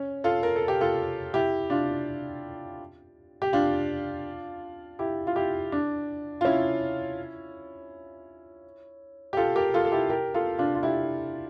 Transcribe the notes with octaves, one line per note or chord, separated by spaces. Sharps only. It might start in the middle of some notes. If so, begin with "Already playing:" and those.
Already playing: C#4
F4 A4
A#4
A4
G4
F4 A4
E4 G4
D4 F4
G4
D4 F4
E4 G4
F4
E4 G4
D4
F4
C#4 E4
G4
F4 A4
G4 A#4
F4 A4
A4
E4 G4
G4 A#4
F4 A4
D4 F4
F4
E4 G4